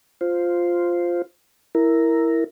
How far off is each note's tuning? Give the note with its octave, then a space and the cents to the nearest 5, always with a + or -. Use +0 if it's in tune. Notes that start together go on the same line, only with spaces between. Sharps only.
F4 +0 C5 -5
E4 +0 A#4 +0